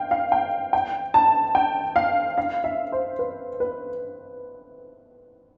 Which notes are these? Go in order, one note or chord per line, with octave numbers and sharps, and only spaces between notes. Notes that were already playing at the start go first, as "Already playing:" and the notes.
Already playing: F5 G5
F5
G5
G5
A5
G5
F5
F5
E5
C5
B4
B4